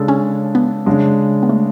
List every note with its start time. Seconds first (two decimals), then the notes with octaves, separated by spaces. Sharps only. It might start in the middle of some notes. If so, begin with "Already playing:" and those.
Already playing: C#3 G#3 D4 A4
0.08 C#4
0.55 B3
0.86 C#3 G#3 D4
1.43 B3
1.49 A3